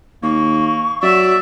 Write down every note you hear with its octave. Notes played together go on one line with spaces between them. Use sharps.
D#2 A#3 C#6
F#3 D5 E5